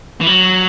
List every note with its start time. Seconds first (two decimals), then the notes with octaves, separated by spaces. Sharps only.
0.21 E3
0.27 F#3